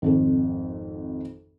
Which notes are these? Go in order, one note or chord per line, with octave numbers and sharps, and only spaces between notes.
G#1 F2 A4